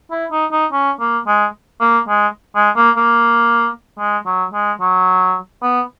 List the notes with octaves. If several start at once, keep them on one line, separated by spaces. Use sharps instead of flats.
E4
D#4
D#4
C#4
A#3
G#3
A#3
G#3
G#3
A#3
A#3
G#3
F#3
G#3
F#3
B3